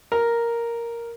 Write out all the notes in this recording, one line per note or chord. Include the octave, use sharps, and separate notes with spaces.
A#4